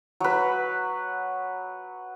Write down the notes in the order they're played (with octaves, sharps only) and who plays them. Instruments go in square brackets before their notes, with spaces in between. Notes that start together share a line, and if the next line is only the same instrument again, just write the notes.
[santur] F#3 B4